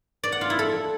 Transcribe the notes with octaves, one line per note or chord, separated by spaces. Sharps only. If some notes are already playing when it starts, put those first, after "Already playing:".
D5
F#5
F4
E4
A4